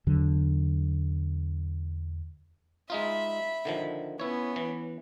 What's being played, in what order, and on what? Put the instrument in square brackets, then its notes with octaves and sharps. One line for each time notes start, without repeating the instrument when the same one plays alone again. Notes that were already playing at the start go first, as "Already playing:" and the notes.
[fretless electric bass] E2 D3 F#3
[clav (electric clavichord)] G#3 D#4 F4 [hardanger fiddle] E5 B5
[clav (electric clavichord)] D3 D#3 F3
[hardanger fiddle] B3 C#4 [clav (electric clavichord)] E4 C#5
[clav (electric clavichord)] E3